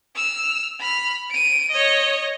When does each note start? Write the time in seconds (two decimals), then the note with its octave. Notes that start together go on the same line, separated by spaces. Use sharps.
0.16 E6 F6
0.80 B5 F6
1.30 D7 D#7
1.71 C#5 D#5